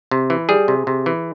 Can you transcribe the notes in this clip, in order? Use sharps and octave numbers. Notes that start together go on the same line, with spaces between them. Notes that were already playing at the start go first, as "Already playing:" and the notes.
C3
E3
G3 G#4
C3
C3
E3